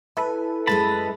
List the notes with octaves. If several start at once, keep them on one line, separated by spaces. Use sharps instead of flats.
E4 A4 B4 G#5
F#2 G#3 D#5 A5 B5